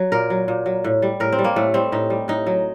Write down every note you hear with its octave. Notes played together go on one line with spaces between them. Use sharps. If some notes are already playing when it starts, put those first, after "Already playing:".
Already playing: F#3
A#2 A#4
F#3
A#2
F#3
A2
G3
A2 A#4
C4
G3
A#3
A2 A3
G3 C4
A2 D#4
G3
A2 D#4
F#3